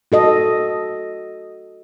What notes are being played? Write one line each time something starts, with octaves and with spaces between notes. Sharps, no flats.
F#4 A4 D#5